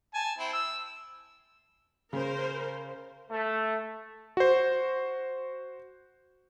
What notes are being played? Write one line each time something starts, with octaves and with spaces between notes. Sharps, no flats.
G#5 A5
C4 E4
E6
C#3 A#4 C5
A3
F#4 C5